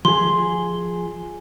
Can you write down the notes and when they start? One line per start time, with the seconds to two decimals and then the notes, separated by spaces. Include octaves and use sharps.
0.05 F3 G#4 C6